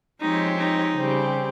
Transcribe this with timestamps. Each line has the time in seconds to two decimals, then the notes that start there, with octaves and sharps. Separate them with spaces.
0.21 F3 G#3 C4 D#4 G4 C#5
0.58 D#4
0.95 C#3 G3 C4 G4